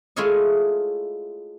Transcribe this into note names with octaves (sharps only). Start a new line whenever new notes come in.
G#3 A3 E4 F4 C#5 D#5